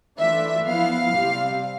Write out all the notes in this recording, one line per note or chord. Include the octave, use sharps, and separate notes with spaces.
E3 A3 D4 F4 E5
F3 B3 E4 F5
C3 G3 C4